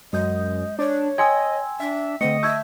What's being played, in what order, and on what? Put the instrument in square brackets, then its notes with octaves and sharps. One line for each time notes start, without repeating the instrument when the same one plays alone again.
[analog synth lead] F#2 [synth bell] G#3 D#6 G6 [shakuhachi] D#5
[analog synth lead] D4 [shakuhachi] C#5
[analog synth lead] D#5 [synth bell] G5 E6 [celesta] G#5 C6 G#6
[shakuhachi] D4 [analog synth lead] E5
[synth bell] D3 A3 [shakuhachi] C4 [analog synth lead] D#5 [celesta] C#7
[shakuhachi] E5 [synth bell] A5 C#6 G6 [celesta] E6 G#6